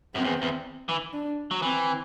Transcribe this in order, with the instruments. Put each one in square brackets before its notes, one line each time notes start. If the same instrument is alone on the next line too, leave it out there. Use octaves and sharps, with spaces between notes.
[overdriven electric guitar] F#2 [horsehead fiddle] C4
[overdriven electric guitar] E2
E2
E3
[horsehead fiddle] D4
[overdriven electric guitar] F#3
[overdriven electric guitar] E3 [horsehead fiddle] C4